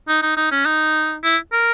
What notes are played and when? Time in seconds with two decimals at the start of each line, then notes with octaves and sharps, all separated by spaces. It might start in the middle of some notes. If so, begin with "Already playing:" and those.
0.08 D#4
0.22 D#4
0.37 D#4
0.51 C#4
0.65 D#4
1.23 E4
1.52 A#4